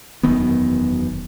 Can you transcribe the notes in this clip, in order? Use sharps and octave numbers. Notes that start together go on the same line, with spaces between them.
E1 F#2 D#3 B3